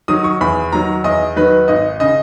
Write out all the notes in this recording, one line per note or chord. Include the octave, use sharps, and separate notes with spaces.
D#3 F#3 D#6
C#6
E2 B5
D#3 F#3 A#5
E2 D#5
D#3 F#3 B4
G#1 D#5
C#3 D#5